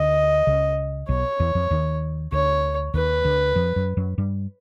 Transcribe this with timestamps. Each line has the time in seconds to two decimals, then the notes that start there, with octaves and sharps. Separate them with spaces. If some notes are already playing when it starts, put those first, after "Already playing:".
Already playing: D2 D3 D#5
0.47 C#2 C#3
1.09 B1 B2 C#5
1.40 E2 E3
1.55 F2 F3
1.70 D#2 D#3
2.32 D2 D3 C#5
2.94 D#2 D#3 B4
3.24 D2 D3
3.55 F2 F3
3.76 F#2 F#3
3.97 F#2 F#3
4.18 G2 G3